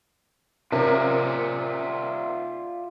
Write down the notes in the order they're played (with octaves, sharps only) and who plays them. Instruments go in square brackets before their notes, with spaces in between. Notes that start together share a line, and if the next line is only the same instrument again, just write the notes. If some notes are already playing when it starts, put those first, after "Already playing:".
[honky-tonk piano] C3 C#4 A#4 [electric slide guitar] F4 D5 E5